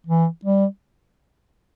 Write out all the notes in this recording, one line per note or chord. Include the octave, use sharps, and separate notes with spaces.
E3
G3